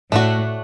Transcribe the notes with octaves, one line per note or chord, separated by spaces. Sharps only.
A2 A3 D4 F#4